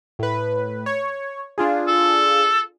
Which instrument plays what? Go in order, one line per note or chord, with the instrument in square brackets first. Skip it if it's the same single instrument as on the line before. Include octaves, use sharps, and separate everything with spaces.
[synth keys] A2 B4
C#5
D4 F4 G#4
[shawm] A4